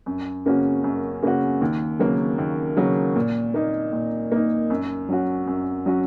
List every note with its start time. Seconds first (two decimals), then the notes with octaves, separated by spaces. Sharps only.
0.06 F#2
0.46 C#3 A#3 C#4 F#4
0.84 F#2
1.23 C#3 A#3 C#4 F#4
1.61 D#2
1.99 C#3 F#3 A#3
2.38 D#2
2.77 C#3 F#3 A#3
3.16 A#2
3.54 A#3 D#4
3.93 A#2
4.32 A#3 D#4
4.70 F#2
5.09 F#3 C#4 F#4
5.47 F#2
5.86 F#3 C#4 F#4